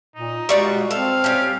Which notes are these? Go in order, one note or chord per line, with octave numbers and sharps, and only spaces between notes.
A#2 D#4
G3 G#3 F4 F#4 D5 C#6
C4 A4 F5
G3 C#4